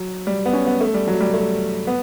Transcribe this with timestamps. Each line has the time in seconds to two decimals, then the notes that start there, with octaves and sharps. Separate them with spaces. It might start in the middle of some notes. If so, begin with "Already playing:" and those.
Already playing: F#3
0.27 G3
0.46 B3
0.53 C#4
0.67 B3
0.81 A3
0.94 G3
1.08 F#3
1.21 G3
1.34 A3
1.87 B3